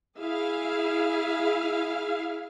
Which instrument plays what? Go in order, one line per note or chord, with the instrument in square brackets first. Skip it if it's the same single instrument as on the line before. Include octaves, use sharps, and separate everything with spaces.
[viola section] E4 G#4 F5